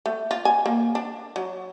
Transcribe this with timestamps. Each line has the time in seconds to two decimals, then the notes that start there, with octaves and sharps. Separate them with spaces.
0.06 A3
0.31 F4
0.45 G#5
0.66 A#3
0.95 D4
1.36 F#3